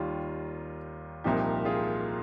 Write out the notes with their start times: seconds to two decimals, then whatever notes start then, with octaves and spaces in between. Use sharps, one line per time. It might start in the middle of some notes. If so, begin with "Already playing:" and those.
Already playing: D#2 D#3 G3 F4
1.24 C2 A#2 F3 D#4 G4
1.65 F4 G#4